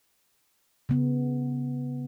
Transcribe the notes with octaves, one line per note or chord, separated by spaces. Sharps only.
C#3 B3